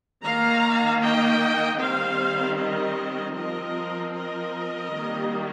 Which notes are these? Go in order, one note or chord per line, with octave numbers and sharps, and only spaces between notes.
D#3 A#3 F5 A#5
D#5 G5
D#3 G3 C4 C5 F5
A#4 D#5
F3 C4 A#4 D#5
A#4 D#5
D#3 G3 A#3